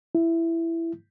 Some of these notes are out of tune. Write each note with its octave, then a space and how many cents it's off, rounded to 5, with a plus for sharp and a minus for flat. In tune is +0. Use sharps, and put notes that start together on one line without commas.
E4 +10